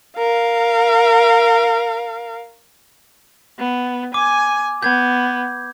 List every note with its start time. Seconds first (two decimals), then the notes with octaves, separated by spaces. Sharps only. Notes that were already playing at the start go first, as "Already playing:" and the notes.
0.18 A#4 F5
3.59 B3
4.14 G#5 D6
4.83 B3 G6 G#6